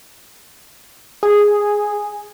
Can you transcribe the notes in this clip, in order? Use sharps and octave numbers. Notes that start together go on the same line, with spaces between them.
G#4